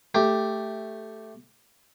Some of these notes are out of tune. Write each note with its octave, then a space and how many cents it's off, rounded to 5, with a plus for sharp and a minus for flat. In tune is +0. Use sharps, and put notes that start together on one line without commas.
A3 +0 G4 +0